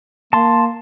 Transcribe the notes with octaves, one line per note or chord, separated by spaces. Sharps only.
A#3 A5 C6